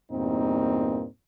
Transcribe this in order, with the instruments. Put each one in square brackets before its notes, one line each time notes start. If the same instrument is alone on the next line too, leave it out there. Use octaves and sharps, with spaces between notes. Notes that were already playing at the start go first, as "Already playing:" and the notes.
[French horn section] E2 G2 A#2 A#3 C4 D#4